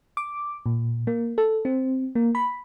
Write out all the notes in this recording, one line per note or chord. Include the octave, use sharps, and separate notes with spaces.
D6
A#2
A#3
A4
C4
A#3
B5